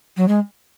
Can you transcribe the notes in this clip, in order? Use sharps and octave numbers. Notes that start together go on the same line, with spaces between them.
F#3
G#3